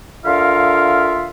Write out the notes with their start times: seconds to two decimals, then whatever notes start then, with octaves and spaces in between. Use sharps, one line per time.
0.25 D3 F4 A#4 E5 F5